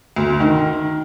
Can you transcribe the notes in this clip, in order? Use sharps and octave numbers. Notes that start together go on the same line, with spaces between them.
D2
D#3